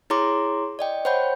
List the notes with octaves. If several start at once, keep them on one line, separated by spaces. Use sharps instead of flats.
E4 G#4 C#5 A#5 C6 D6
D5 D#5 G5
C5 C#5 F#5 G5 B5 G6